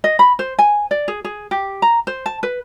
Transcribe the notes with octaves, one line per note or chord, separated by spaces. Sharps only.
D#5
B5
C5
G#5
D5
G#4
G#4
G4
A#5
C5
A5
B4